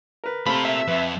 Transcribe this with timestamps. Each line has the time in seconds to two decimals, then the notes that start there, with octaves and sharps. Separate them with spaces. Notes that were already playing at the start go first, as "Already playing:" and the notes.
0.24 A#4 B4
0.46 C3 A3 C4 F4 A#4 B5
0.65 E5
0.88 F2 B4